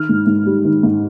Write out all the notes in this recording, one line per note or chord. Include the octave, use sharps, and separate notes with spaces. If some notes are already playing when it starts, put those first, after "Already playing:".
Already playing: D#3 F6
G#2
G#2
G3
D#3
G#2